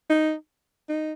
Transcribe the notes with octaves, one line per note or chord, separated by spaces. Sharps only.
D#4
D#4